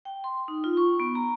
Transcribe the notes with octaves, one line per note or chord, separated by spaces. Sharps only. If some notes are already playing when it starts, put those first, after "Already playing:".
G5
C6
D#4
F4
C#6
B3
A#5